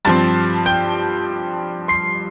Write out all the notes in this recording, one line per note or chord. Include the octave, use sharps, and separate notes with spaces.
G2 F3 C4 A5 A6
G5 G6
C6 C7